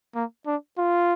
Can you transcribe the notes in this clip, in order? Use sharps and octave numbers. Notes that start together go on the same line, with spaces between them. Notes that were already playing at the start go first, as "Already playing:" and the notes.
A#3
D4
F4